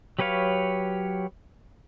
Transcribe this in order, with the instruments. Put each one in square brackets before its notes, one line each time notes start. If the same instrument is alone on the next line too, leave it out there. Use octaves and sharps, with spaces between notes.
[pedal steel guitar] F#3 G4 B4 C#5 F5